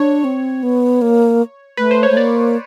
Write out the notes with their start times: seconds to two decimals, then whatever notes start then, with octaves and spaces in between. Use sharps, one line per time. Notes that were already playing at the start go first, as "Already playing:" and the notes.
Already playing: D4 C#5
0.24 C4
0.63 B3
1.02 A#3
1.77 A3 B4
1.91 C5
2.03 C#5
2.10 A3
2.16 A#3 D5